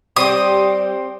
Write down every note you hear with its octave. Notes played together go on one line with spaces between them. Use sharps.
G3 C4 G4 D#6